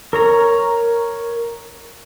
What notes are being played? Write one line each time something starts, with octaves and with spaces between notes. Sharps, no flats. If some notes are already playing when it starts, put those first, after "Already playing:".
A#4 C#5 A#5